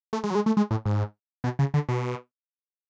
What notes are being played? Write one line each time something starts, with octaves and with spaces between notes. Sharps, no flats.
A3
G#3
F#3
G#3
A3
G#3
A2
G#2
B2
C#3
D3
B2